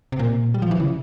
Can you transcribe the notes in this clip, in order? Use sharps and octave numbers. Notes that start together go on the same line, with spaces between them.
C3
A#2
G3
F3
E3
C#3